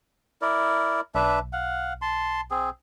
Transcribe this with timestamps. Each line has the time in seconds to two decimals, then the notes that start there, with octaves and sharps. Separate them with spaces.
0.42 E4 A#4 D5
1.15 B1 D4 B4 E5
1.53 F5 F#5
2.02 A5 C6
2.51 C4 G#4